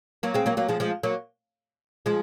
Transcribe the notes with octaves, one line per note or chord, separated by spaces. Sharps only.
F#3 A#3
G#3 C4
F#3 A#3
F#3 A#3
F3 G#3
F3 G#3
F#3 A#3
F3 G#3